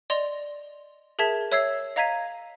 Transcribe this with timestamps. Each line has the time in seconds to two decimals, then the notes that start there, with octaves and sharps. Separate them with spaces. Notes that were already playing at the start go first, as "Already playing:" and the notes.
0.10 D5 D#5 C6 F7
1.19 G#4 A#4 E5 A5 G#6 B6
1.52 C#5 E5 E6 G#6 C7
1.96 D#5 F5 A#5 G#6 B6 D#7